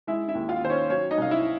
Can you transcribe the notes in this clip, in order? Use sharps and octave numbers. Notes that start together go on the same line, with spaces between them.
G#3 E4 E5
E4 E5
D#2
F4 F5
D#3 C5
C#4 C#5
F#3 C#4 C#5
D#4 D#5
C2 F5
E4 E5